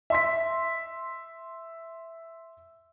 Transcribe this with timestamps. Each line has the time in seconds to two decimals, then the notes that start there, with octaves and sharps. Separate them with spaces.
0.10 E5 C6 B6